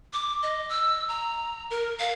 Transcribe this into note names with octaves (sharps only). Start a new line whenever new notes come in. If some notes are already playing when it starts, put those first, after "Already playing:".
D6
D#5
E6
A#5
A#4
F5